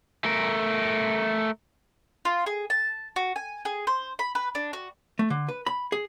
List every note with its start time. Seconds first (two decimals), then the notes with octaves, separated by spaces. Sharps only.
0.24 A3 A#4
2.25 F4
2.46 G#4
2.70 A5
3.16 F#4
3.36 G#5
3.65 G#4
3.87 C5
4.19 B5
4.35 B4
4.55 D4
4.73 F#4
5.19 A3
5.30 D3
5.49 B4
5.67 B5
5.92 G#4